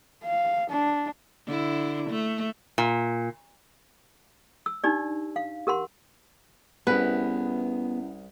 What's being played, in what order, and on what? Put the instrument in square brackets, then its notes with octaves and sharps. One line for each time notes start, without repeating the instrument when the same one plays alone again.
[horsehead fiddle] F5
D4
[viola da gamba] D3 E4
A3
[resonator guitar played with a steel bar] A#2
[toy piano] E6
D4 D#4 G4 D5
F5
G4 A#4 F#5 C6
[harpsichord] C2 [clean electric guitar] B3 G#4 [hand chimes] C#4 E4 F#5 [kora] B4